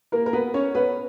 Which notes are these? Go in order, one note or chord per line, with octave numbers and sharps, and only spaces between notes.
A#3 A#4
A#4
B3 B4
C#4 C#5
B3 B4